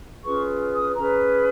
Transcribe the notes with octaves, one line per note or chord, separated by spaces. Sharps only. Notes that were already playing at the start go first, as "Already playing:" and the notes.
C#4 F4 G#4 B4 C#6
D#6
C#4 G#4 B4 A#5